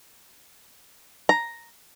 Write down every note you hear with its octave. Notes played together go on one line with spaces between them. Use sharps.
A#5